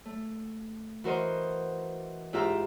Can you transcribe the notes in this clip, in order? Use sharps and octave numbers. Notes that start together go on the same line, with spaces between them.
A3
E3 F#4 A#4 C5 D#5
G#2 E4 F4 G4 E5 A#5